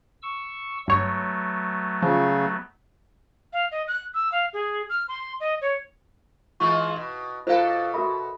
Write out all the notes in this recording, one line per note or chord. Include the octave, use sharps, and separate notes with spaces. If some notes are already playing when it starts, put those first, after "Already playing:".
C#6 E6
G1 F#3 A3 B3 C#5
C#3 F3
F5
D#5
F#6
E6
F5
G#4
F6
C6
D#5
C#5
E3 G#3 F4 C#6
B2
B2 F4 A4 A#4 C5 F5
D6
F#4 A#4 E5 B5